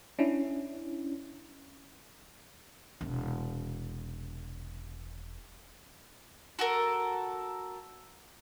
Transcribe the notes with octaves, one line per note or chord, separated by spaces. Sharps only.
C#4 D4 E4
E1 C3
F#4 A4 A#4